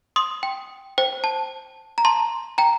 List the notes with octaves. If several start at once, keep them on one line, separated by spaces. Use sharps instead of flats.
C6 D#6
G5
C5 G5
A5
A#5
A5 C6
G5 A#5